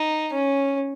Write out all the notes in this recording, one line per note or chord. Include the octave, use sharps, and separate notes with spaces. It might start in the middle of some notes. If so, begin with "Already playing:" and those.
Already playing: D#4
C#4